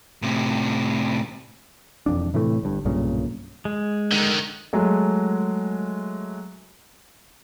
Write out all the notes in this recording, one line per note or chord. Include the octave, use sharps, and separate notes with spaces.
A2 C3
E1 F2 D4
A2 C3 E3 A3
G1 G2
B1 G2 A#2 C#3
G#3
D3 D#3
F#3 G#3 A3